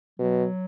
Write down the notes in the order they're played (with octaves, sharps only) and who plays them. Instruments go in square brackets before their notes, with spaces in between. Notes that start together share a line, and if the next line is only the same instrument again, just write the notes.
[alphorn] B2 [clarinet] F#3